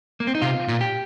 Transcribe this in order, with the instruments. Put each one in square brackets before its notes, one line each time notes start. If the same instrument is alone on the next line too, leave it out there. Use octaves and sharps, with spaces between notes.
[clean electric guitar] A#3
C4
D#4
[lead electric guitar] C3 [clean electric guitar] F4
[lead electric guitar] A#2
[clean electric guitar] G4